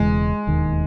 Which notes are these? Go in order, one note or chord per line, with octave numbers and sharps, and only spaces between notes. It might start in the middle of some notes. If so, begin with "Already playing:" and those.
Already playing: E1 E2 C#3 E3 G#3
E1 D#2 D#3